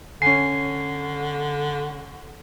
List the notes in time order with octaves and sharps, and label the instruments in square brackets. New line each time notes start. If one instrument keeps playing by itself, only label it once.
[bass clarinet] D3 [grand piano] C#4 G#5 [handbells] C7